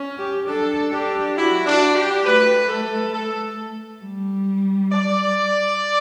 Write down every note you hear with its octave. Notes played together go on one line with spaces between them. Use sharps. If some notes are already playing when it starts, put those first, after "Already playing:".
Already playing: C#4
G4
D4 A4
D4 G4
E4 F#4
D4
G4
A3 B4
A4
A4
G3
D5